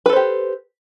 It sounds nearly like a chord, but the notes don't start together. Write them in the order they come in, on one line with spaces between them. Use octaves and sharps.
B4 A4 C5 G4